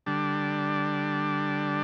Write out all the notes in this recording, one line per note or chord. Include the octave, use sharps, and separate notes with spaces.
D3 G3 D4